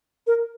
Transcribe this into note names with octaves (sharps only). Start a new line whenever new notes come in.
A#4